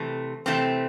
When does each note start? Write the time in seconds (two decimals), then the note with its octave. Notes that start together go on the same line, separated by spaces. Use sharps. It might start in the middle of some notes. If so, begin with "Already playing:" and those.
Already playing: C3 E3 A3
0.46 C3 E3 A3 C4